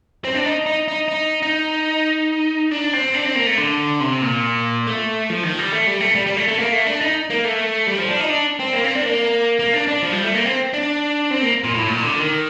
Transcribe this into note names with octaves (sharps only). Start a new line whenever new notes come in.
C4
D4
D#4
D#4
D#4
D#4
D#4
D4
C4
D4
C4
A#3
A3
D3
C3
A#2
A3
F3
D#3
G3
A3
G3
A3
G3
G3
A3
A3
A#3
A3
D4
D#4
A#3
A3
G3
F3
D4
D#4
D4
C4
A#3
C4
D4
A#3
A#3
D4
D4
F3
G3
A3
A#3
C4
D4
C4
A#3
A#2
A2
A#2
D3
D#3